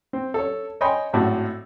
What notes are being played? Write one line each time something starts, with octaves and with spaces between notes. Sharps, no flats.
C4
A4 C#5
C#5 D#5 G5 G#5 B5 C6
G#1 A2 F#4